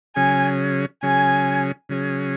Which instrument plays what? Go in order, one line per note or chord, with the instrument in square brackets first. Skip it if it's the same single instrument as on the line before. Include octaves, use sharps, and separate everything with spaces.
[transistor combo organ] C#3 F#3 C#4 G#4 [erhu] G#5
[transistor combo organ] C#3 F#3 C#4 G#4 [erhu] G#5
[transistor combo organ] C#3 F#3 C#4 G#4